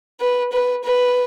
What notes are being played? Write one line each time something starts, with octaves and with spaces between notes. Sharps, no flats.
B4
B4
B4